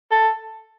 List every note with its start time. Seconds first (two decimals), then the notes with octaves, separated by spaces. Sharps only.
0.11 A4